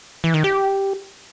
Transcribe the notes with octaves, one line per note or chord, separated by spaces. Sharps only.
E3
D#3
G4